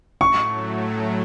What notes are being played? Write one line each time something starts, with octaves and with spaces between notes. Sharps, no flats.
A2 F#3 A3 C#6